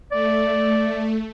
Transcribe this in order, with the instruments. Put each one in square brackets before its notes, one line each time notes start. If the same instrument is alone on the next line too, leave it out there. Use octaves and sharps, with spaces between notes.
[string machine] A3 [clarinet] D5